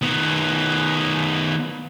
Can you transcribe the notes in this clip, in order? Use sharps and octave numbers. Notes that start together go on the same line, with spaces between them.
D#3 B3